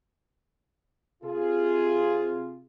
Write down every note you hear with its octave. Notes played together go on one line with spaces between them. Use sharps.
C3 F4 G#4